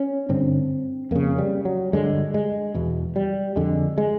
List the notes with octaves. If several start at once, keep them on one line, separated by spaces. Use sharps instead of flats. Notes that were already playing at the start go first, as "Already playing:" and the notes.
Already playing: C#4
G2 D3 C4
F2 C#3 A#3
G3
F#3
G2 D3 G#3
G#3
E2 B2
G3
F2 D3 G#3
G#3